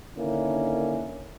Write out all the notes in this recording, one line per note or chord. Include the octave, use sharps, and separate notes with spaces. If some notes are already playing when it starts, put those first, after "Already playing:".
D3 D#3 A#3 C#4 D4 E4